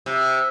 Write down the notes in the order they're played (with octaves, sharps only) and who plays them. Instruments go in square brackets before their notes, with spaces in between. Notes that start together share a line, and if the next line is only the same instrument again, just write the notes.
[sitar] C3